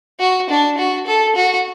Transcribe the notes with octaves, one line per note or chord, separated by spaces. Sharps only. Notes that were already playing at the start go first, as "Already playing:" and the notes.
F#4
D4
F#4
A4
F#4